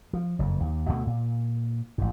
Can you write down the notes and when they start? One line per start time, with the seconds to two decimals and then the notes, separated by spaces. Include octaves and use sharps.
0.13 F3
0.39 F#1 F2
0.60 D#2
0.88 D2 B2 F#3 A3
1.07 A#2
1.98 A1 G#2